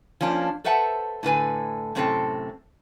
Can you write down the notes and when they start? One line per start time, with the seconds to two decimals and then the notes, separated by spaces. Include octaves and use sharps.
0.21 F3 A#3 C#4 D4
0.64 A4 B4 C5 E5 F#5 A5
1.23 A2 D3 B4 G#5
1.95 F#2 A2 C3 C4 A4 G5